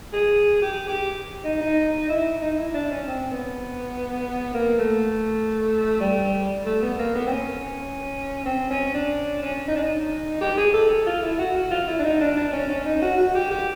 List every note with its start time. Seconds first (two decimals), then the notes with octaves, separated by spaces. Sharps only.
0.13 G#4
0.62 G4
0.87 G4
1.44 D#4
1.61 D#4
2.09 E4
2.41 D#4
2.58 E4
2.74 D4
2.91 C#4
3.07 C4
3.31 B3
4.54 A#3
4.78 A3
6.00 G3
6.66 A3
6.82 B3
6.98 A#3
7.15 B3
7.26 C4
7.31 C#4
8.45 C4
8.70 C#4
8.94 D4
9.42 C#4
9.68 D#4
9.75 D4
9.83 D#4
10.41 G4
10.57 G#4
10.73 A4
10.89 A4
11.06 F4
11.22 E4
11.39 F#4
11.55 F#4
11.71 F4
11.87 E4
11.98 D4
12.04 D#4
12.20 D4
12.37 D4
12.53 C#4
12.69 C#4
12.85 D#4
13.02 F#4
13.18 F#4
13.34 G4
13.50 G4